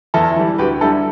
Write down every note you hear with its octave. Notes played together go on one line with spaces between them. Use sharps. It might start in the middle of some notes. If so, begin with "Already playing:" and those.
E2 E4 A4
E3 G3
D2 G4 B4
D3 G3 E4 A4